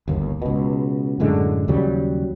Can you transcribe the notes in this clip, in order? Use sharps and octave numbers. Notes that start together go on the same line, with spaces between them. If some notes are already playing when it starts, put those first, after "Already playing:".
G1 D#2
C#2 B2
F#2 A2 D3 G#3
D#2 C#3 F#3 G3